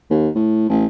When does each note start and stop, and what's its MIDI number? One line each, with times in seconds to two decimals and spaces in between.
0.10 0.29 39
0.35 0.69 45
0.70 0.86 33